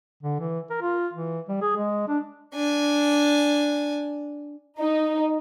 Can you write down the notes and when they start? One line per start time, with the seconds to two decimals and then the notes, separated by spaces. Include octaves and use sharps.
0.23 D3
0.40 E3
0.70 A#4
0.81 F4
1.13 E3
1.48 G3
1.62 G#4
1.77 G#3
2.08 D4
2.55 D4 G#5
4.79 D#4